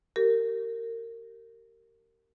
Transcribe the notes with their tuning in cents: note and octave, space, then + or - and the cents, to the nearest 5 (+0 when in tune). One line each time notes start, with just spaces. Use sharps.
G4 -30 A#4 -25